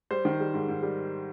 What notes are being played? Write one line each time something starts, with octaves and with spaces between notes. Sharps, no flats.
G3 C5
D#3
G3
G#2
G#2
G3